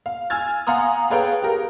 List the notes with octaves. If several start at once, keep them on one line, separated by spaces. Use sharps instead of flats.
F5
G#5 E6 F6 G#6 A6
F5 F#5 G#5 A#5 C6 D#6
G#4 A4 B4 C#5 F5 G5
G4 A#4